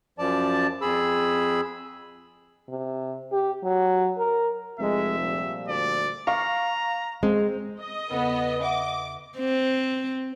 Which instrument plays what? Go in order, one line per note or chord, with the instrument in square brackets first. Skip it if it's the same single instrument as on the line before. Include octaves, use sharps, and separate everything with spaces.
[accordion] F#2 F3 D5 A5
F2 G#4 B5 E6
[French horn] C3
G4
F#3
A#4
[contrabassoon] F1 [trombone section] G#3 [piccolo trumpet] E5
[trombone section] A#2 F3 G3
[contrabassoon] D2 [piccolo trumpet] D5
[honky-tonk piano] F5 C#6 [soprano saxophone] A#5
[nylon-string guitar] G#3 [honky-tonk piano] C4
[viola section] D#5
[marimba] E2 C#3 A4 [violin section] B3
[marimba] E5 F#5 [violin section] D6
[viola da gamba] C4